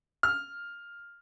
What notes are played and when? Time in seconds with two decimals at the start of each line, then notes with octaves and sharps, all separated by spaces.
0.23 F6